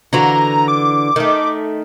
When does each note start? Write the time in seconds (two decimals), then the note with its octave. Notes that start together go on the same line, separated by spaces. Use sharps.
0.13 D3 E3 F#4 A#5
0.68 D6
1.16 D#3 A3